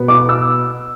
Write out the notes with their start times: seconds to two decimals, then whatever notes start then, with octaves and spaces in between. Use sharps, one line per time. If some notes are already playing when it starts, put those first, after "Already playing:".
Already playing: B2 B3
0.08 D6
0.29 E6